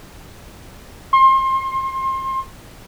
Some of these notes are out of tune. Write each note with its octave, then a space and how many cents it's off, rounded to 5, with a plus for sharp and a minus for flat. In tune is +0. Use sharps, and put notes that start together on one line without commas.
C6 +30